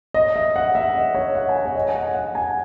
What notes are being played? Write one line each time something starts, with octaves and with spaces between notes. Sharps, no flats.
D#5
E5
F#5
E5
D#5
C#5
F#5
G#5
F#5
C#5
D#5
G#5
F#5
F#5
G#5